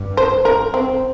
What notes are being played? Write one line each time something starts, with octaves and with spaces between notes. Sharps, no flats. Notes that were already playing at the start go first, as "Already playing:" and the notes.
Already playing: G2
C5
A#4
C4